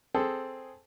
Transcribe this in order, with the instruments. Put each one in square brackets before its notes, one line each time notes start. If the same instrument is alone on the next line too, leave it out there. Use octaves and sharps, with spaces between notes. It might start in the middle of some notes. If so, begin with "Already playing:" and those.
[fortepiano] C4 G#4 A4